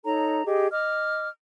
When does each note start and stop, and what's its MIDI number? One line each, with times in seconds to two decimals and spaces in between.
0.05 0.45 63
0.05 0.45 69
0.05 0.45 73
0.05 0.45 82
0.45 0.67 67
0.45 0.67 68
0.45 0.67 75
0.71 1.28 75
0.71 1.28 86
0.71 1.28 89